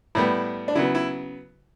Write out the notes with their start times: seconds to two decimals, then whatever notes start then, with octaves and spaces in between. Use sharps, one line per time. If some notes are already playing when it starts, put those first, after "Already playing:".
0.15 A2 G3 B3 E4
0.68 D4
0.75 C#3 F#3 B3 E4
0.95 E4